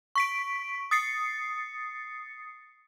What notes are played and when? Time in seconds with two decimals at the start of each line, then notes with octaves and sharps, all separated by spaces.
0.15 C#6 B6 D7
0.91 D#6 A6 C7 C#7